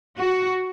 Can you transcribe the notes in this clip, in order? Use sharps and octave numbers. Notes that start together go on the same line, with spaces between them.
F#4